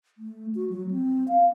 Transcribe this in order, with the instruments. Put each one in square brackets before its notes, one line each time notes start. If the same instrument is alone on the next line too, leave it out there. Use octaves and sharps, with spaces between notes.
[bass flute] A3
F#4
F#3
C4
F5